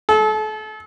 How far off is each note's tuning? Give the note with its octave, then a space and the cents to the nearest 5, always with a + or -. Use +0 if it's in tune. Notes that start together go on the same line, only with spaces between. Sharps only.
A4 -35